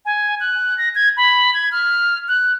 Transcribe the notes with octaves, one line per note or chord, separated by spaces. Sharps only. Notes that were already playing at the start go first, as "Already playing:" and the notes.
G#5
F#6
A#6
G#6
B5
G#6
F6
F#6